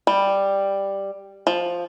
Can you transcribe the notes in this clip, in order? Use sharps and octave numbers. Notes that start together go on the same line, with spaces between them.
G3
F3